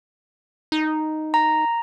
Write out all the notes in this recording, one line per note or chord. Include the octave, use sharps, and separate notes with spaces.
D#4
A#5